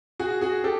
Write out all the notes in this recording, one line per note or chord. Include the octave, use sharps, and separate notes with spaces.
F#4 G#4
F#4 G#4
G4 A4